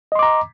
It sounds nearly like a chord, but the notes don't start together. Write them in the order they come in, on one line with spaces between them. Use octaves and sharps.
D#5 C6 D6 A#5